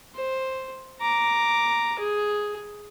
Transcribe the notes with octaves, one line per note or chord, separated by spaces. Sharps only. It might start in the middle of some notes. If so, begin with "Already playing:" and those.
C5
A#5 D6
G#4